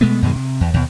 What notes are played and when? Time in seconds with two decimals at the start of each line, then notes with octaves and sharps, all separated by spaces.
0.01 B2 G#3 A3 B3
0.22 F#2 B2 D#3 G#3
0.36 C3
0.61 E2
0.74 D#2 B2